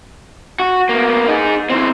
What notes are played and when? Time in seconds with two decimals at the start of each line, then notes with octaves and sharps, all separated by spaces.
0.60 F#4
0.89 A#3 B3
1.28 D#4 G#4
1.70 E3 C4